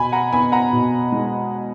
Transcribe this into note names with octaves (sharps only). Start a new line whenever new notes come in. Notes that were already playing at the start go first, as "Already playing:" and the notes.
Already playing: B2 G#5 B5
F#5 A#5
B3 G#5 B5
F#5 A#5
B2
G#3